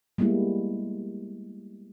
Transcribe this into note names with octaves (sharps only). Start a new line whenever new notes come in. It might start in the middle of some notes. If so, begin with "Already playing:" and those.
G3 G#3 A#3 B3 E4